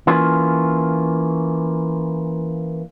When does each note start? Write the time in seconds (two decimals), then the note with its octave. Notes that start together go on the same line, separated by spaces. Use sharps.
0.07 E3 A#3 C#4 F4